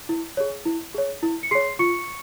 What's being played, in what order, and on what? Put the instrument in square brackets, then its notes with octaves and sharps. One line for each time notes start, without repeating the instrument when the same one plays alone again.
[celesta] E4
G#4 C#5
E4
G#4 C#5
E4
C#7
G#4 C#5 C6 C7
F4 C#6 C#7